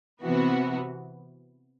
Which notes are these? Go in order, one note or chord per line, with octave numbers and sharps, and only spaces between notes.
C3 E3 B3 F#4